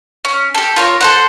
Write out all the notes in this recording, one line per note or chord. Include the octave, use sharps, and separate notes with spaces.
C#4
G4 A4
F4 A#4 C#5
A4 C5 F#5